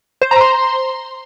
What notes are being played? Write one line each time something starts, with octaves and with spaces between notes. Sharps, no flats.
C5
A#5
C6